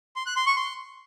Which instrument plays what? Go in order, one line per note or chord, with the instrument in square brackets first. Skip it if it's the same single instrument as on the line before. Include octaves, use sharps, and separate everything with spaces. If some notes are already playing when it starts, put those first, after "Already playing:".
[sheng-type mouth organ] C6
F#6
C6
C#6
C6